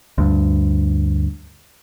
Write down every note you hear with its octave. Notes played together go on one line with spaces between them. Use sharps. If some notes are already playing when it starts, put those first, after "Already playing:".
D2 G2